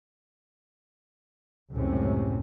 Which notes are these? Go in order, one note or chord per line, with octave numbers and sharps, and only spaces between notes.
C#2 F#2 A2 C3 C#4